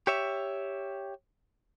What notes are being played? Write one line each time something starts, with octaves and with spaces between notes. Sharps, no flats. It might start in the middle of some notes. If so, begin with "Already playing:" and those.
G4 C#5 E5